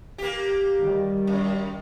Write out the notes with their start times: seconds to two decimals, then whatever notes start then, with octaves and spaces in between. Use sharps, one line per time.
0.18 A#3 G4
0.80 D#3 G3
1.27 F#2